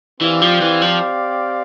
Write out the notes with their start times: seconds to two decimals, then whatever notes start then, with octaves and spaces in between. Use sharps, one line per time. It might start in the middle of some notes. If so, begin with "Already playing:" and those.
0.21 E3 C4 G4 D5 F5
0.41 F3
0.61 E3
0.82 F3